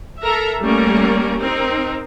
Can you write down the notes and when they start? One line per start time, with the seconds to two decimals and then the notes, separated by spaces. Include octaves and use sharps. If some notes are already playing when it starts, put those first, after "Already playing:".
0.21 A4 A#4 E5 A#5
0.63 G3 A3 A#3 C#4 A#4 D5
1.40 C4 D#4 A#4